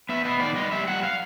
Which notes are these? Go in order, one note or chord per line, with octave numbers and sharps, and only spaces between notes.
B3 E5
B3 D#5
D#3 D5
G3 D#5
G3 E5
G3 F#5
F5